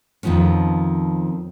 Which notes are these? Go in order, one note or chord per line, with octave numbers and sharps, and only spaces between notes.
F2 D#3 F3 B3 C#4